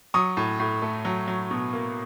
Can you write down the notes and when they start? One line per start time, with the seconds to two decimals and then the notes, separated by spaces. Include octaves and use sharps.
0.14 F#3 C#6 D#6
0.37 A2
0.60 A2
0.82 A3
1.05 F#3
1.28 F#3
1.51 B2
1.73 A#3